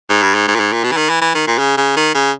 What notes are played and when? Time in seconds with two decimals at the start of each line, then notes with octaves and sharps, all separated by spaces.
0.10 G#2
0.23 G2
0.35 G#2
0.48 G#2
0.55 A#2
0.60 G#2
0.73 A#2
0.84 B2
0.92 E3
0.97 D#3
1.09 E3
1.21 E3
1.35 D#3
1.47 A#2
1.58 C#3
1.77 C#3
1.97 D#3
2.15 C#3